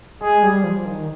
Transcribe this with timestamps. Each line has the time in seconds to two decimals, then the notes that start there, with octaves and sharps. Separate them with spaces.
0.21 G#3 G#4
0.43 G3
0.64 F3
0.85 D#3